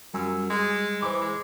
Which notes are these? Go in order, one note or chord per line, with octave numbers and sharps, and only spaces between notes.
F#2 G3 G#5 E6
G#3
E3 C5 D6
G#3